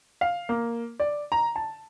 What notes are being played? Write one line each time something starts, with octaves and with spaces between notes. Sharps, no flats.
F5
A#3
D5
A#5
A5